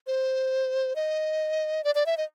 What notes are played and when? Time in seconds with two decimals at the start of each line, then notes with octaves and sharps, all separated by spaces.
0.07 C5
0.96 D#5
1.84 D5
1.95 D5
2.06 E5
2.17 D#5